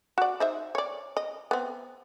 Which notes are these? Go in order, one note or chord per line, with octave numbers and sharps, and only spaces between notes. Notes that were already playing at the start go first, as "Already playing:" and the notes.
F#4 D5
D#4 C5 E5
C#5 D5
D#5
B3 C4